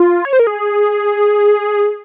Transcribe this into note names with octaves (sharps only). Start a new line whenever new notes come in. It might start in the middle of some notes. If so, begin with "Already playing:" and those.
Already playing: F4
C#5
C5
A#4
G#4